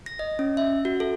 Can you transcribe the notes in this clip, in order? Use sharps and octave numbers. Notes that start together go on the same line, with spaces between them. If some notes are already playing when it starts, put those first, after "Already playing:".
A#6
D#5
C#4
E5
F#4
A4